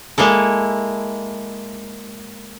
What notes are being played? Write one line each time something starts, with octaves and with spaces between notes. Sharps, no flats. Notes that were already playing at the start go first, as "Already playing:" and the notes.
G#3 A#3 E4 A4